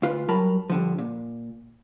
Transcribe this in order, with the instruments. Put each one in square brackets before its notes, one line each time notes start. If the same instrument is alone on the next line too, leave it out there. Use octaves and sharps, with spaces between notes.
[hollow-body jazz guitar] D2 F4 B4
G2 F#3 A#4 A5 B5
G2 D3 F3
A#2